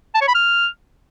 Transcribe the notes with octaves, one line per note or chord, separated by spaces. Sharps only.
A5
C#5
B5
F6